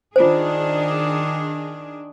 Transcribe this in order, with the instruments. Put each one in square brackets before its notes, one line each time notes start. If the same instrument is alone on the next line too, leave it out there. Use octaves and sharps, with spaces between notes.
[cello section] D#3 D4 G#4 [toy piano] F4 C5